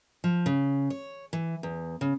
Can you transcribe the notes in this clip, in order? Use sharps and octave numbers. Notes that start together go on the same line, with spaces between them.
F3
C#3
C#5
E3
E2
C#3